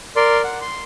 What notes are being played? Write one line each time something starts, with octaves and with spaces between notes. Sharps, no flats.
A#4 D5 C6
F#5
C6